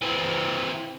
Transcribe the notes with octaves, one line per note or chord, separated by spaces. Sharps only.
E3 C4